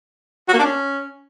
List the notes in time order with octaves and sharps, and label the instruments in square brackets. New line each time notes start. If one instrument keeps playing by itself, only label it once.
[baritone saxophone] F#4
A#3
D4
C#4